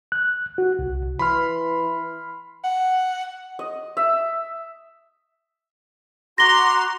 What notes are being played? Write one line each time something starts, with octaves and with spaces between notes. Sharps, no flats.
F#6
F#4
C2
E3 B5 C6 F6
F#5
D#5
E5
F#4 A#5 C6 D6 A#6 G7